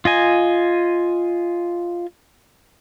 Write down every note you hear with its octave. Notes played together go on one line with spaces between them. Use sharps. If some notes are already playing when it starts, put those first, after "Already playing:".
F4 D#5 G#5